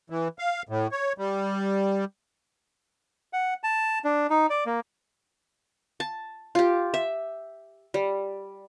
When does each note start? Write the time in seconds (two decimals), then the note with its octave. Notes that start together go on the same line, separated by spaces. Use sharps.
0.10 E3
0.39 F5
0.69 A2
0.92 C#5
1.18 G3
3.33 F#5
3.63 A5
4.04 D4
4.30 D#4
4.50 D5
4.66 A#3
6.00 A5
6.55 F4 G4
6.94 E5
7.94 G3